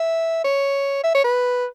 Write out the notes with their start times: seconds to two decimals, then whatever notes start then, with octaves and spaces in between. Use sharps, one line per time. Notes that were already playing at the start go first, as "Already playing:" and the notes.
Already playing: E5
0.45 C#5
1.04 E5
1.14 C#5
1.24 B4